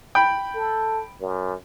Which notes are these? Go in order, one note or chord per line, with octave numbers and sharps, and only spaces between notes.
G5 B5
A4
F#2